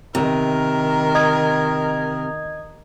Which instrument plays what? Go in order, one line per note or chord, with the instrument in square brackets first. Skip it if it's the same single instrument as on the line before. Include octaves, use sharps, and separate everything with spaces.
[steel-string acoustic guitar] C3 [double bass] D#3 [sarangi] A#4
[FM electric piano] D#5 D#6 G#6